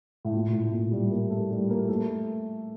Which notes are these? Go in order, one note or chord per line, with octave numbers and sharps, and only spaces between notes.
A2
A#2
A2
A#2
G3
A#3
A3
G3
A#3
A3